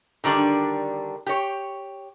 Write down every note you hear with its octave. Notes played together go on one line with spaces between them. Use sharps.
D3 D#3 G3 D4
G4 C#5